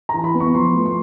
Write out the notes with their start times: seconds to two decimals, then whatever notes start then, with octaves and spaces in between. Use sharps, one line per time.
0.09 E3 A#5
0.24 B5
0.34 B3
0.40 C#6
0.55 F3 C6
0.75 A3
0.86 C6